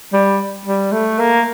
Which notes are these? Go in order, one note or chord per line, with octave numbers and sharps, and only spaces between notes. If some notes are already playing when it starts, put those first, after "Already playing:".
G3
G3
A3
A#3